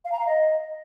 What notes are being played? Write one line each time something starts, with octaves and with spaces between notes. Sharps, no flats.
F5
A#5
F5
D#5